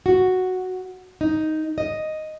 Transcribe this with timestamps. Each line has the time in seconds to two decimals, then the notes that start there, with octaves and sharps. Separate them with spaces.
0.06 F#4
1.21 D#4
1.78 D#5